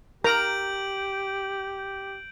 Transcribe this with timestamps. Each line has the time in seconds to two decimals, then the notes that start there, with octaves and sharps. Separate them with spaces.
0.24 G4 A#4 A#5 G6 D7 F#7